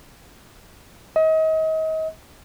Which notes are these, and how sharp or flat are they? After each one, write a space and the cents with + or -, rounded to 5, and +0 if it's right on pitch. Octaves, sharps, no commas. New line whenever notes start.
D#5 +35